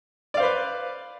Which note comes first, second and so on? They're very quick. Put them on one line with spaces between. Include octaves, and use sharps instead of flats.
D5 F5 C5 B4